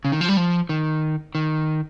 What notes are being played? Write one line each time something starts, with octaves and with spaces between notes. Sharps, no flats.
C#3
D#3
F3
G3
F3
D#3
D#3